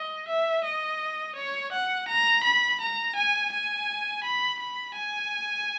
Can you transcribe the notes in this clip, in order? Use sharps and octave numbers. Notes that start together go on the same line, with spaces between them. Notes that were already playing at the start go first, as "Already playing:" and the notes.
Already playing: D#5
E5
D#5
C#5
F#5
A#5
B5
A#5
G#5
G#5
B5
B5
G#5